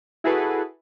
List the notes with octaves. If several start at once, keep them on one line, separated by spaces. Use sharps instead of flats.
E4 F#4 G#4 A4 B4